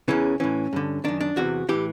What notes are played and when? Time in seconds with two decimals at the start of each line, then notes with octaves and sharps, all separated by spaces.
0.08 E2 C#3 E3 C#4
0.40 A2 E3 C#4
0.73 G2 D3
1.04 F#2 D#3 D4
1.21 D4
1.36 E2 C3 E3 F#4
1.69 A2 E3 G4